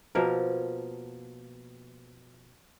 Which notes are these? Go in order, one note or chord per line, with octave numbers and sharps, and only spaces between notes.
B2 F3 A#3 A#4